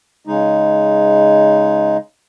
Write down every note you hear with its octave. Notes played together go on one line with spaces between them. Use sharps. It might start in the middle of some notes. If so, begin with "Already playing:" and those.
C#3 G#3 D#4